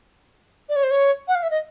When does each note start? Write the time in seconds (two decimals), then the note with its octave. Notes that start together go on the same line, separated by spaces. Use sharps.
0.69 D5
0.76 C#5
0.83 C5
0.91 C#5
1.28 F#5
1.35 F5
1.43 E5
1.51 D#5